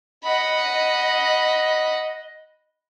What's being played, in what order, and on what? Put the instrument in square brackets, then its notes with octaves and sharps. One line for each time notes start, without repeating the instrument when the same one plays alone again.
[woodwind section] D#5 [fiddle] F#5 B5